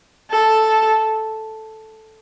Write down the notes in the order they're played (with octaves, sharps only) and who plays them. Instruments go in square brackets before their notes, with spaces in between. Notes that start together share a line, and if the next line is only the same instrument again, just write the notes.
[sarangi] A4